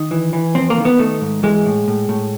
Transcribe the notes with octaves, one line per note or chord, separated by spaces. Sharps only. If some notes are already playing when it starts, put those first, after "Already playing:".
Already playing: D#3
E3
E3
F2 C4
A#3
D#3
B3
D#3 A3
G#2
E3 G#3
A2
A2
A2